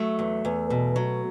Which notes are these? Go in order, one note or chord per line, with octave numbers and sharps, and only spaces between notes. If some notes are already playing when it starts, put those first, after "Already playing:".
Already playing: F#3 A3
E2
E2
B2
F#3